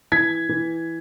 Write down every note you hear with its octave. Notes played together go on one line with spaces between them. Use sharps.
E3 G#6 B6
E3